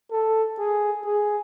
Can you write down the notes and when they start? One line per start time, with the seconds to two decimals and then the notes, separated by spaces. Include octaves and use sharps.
0.12 A4
0.59 G#4
1.05 G#4